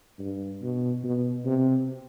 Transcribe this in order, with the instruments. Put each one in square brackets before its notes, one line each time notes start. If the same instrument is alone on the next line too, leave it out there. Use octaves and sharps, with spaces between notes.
[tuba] G2
B2
B2
C3